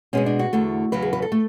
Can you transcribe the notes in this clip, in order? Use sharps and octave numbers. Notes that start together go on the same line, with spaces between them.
B2 G#3 B3 C#4
D4
F#4
E2 D3 A3
E2 C#3 F#3 B4
G#4
B4
A4
A3